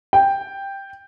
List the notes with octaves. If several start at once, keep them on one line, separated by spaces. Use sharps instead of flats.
G5